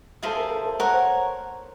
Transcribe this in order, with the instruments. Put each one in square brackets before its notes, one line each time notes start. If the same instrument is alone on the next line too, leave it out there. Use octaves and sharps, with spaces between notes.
[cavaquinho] E4 G#4 C5 F5 [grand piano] A4
[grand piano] A#4
A4
A#4
[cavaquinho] A#4 C#5 F#5 [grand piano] C5
[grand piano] C5